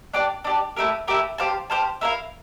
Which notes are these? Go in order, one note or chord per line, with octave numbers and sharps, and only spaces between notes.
D4 G4 D5
D4 G4 D5
A3 E4 G4 A#4
A3 E4 G4 A#4
G4 C5 F5 A5
G4 C5 F5 A5
E4 A#4 F5